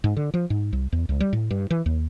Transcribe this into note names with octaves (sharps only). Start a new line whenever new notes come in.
G#2
D3
F3
G#2
C2
E2
C#2
G3
A2
G2
E3
D#2